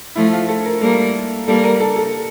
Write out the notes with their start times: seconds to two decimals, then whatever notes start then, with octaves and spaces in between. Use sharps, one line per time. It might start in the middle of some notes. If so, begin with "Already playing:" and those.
0.15 F3 A3 E4
0.33 F4
0.48 A4
0.66 A#4
0.81 G3 A#3 A4
1.47 G3 A#3 A4
1.63 A#4
1.80 A4
1.97 A4